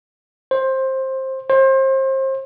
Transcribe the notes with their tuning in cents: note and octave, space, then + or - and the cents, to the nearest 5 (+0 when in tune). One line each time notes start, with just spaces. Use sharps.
C5 +15
C5 +30